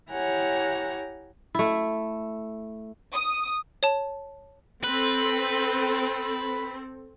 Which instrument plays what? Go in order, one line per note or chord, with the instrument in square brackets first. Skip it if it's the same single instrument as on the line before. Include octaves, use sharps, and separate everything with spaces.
[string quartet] E4 G4 C#5 F#5 G#5 A#5
[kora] A3 E4
[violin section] D#6
[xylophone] C#5 A5
[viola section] C4 A4 [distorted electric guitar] B4